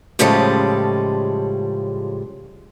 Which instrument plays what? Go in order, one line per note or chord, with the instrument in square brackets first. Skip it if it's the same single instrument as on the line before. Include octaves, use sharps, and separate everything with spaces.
[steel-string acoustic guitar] A2 C#3 F3 G3 G#3 A4